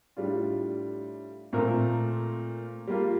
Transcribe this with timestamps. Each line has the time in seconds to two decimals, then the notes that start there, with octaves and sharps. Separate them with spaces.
0.17 A2 G3 D4 F4
1.53 A#2 A3 C4 F4 A#4
2.87 G3 A#3 F4